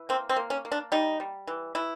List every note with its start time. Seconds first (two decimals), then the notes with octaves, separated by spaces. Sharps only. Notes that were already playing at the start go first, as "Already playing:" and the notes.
Already playing: E3
0.09 A#3 C4
0.29 C4
0.36 A#3
0.50 C#4
0.65 A#3
0.72 D4
0.92 G3 D#4
1.20 G3
1.47 E3
1.75 E3 E4